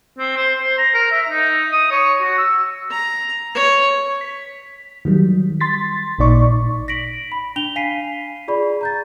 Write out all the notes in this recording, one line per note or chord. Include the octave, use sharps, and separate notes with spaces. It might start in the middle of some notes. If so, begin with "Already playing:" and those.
C4
C5
C5
A#5
A#4
E5
D#4
D#6
C#5
F#4
E6
A#5
C#5
B6
D#3 F#3 G3
C6 A6 B6
A1 A#2 D#4 D5 C#6
A#6 B6 D7 F#7
B5
D4 F7 G7
F5 G#5 B6 C7 D#7
F4 G#4 D5 B5
A#5 G6 A6